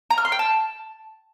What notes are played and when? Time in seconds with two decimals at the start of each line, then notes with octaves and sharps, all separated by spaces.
0.10 A#5
0.18 F6
0.25 C6
0.32 G5
0.39 A5